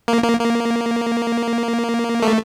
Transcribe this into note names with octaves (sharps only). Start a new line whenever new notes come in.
A#3
A#3
A#3
A3